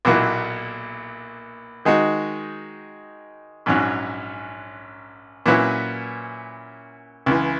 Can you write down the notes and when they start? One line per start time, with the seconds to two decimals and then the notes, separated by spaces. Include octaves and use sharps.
0.05 B1 A#2 F#3 A#3 E4
1.85 D#3 G#3 D#4 F#4
3.66 A#1 G#2 F#3 C#4
5.46 A#2 F#3 C#4 E4 B4
7.26 C#2 C#3 E3